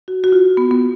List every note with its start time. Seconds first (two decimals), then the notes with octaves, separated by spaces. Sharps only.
0.08 F#4
0.24 F#4
0.32 F4
0.57 B3
0.71 B3